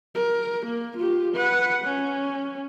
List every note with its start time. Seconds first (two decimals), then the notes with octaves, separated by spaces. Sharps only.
0.15 A#4
0.66 A#3
0.97 F4 G4
1.34 B4 F#5
1.84 C#4